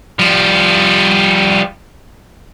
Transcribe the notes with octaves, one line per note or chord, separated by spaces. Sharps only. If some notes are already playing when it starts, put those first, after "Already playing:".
F3 G3